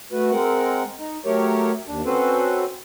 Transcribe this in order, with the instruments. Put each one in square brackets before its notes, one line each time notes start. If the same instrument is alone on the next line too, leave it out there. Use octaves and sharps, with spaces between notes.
[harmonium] A3 F#4 B4
G#3 C4 A#4 F#5
D#4
F#3 A3 G4 A#4 C#5
D#2 D4
C4 C#4 F#4 A4 B4 C5